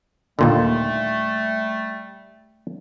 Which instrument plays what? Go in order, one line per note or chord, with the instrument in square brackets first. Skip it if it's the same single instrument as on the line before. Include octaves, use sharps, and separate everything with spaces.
[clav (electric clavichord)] D#2 A#2 D3 [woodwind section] G3 A3